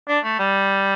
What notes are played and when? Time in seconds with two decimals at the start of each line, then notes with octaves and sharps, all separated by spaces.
0.08 D4
0.24 A3
0.39 G3